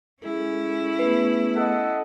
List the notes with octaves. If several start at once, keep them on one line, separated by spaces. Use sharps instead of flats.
G#3 C#4 E4 G#4 A4
A3 B3 G#4 B4
A4 D#5 F#5